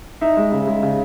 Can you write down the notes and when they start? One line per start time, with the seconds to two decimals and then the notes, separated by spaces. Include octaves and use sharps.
0.21 D#4 E5
0.37 G#3
0.52 C#3
0.67 G#3
0.83 C#3